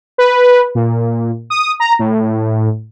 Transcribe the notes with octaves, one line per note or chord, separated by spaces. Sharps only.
B4
A#2
D#6
A#5
A2